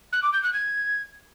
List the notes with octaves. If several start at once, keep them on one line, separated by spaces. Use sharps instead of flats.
F#6
D6
G6
F#6
G#6